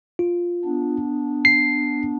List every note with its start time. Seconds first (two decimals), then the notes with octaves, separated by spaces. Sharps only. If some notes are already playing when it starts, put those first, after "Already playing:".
0.19 F4
0.65 B3 D4
1.45 C7